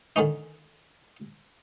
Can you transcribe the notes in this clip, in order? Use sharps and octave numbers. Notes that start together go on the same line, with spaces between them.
D3 D#3 C#4 D#4